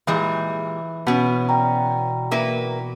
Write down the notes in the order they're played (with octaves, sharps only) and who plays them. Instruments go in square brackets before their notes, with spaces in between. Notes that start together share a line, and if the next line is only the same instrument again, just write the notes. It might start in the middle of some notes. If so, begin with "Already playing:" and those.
[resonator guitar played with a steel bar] A#2 G3 G#3 [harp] E3
[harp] B2 [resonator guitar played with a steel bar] B3 C#4
[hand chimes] D5 G5 A#5
[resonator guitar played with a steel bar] A#3 E4 B4